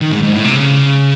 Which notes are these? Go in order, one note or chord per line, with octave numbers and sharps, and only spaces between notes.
D#3
G#2
G#2
A2
C3
C#3